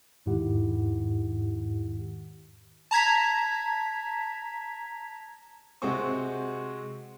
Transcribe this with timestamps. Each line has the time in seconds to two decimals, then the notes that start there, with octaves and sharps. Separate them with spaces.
0.26 E2 G#2 D#3 E4 G4 F#5
2.91 A5 A#5 G#6 B6
5.82 C3 G#3 C4 F#4 C5 C#6